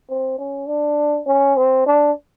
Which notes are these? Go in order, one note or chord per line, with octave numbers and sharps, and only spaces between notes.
C4
C#4
D4
C#4
C4
D4